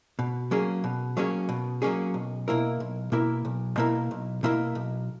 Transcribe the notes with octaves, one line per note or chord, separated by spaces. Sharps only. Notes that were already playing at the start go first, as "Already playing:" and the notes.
B2
F#3 A#3 C#4 G#4
B2
F#3 A#3 C#4 G#4
B2
F#3 A#3 C#4 G#4
B1
B2 A#3 E4 A#4
B1
B2 A#3 E4 A#4
B1
B2 A#3 E4 A#4
B1
B2 A#3 E4 A#4
B1